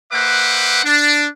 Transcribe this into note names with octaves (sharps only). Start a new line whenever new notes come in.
A#3 B4 C5 E5 F#5 D6
D4